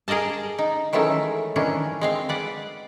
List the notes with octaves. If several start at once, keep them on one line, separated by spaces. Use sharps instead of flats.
G#4 A#4 D5 D#5 A5
D#4
D#3 E3 F#3 G#3 A3 C#4
D#3 E3 C#4 D4
G#3 C4 F5
B4 D5 F#5